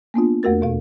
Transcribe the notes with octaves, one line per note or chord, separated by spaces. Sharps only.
A#3 B3 D4 F4
E2 A3 F#4 A#4 A6
D#2 B2 F5